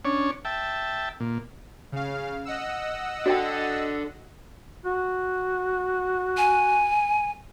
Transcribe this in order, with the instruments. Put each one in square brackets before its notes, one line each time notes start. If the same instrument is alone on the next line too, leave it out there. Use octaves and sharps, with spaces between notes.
[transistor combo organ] C#4 D4 C#5
E5 G5 A5
A#2
[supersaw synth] C#3 F5
D#5 F#5 E6
[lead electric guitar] D4 A4 [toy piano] F#4 D5 G5
[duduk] F#4
[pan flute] G#5